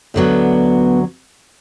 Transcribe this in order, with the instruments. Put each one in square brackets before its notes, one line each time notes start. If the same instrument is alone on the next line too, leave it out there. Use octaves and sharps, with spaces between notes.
[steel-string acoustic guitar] D2 D3 F#3 B3